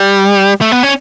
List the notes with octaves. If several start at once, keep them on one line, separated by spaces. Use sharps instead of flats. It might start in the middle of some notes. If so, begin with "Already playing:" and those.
Already playing: G3
A3
B3
C#4